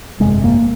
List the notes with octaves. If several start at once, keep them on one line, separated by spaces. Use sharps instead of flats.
G1 F2 C3 G#3
A#3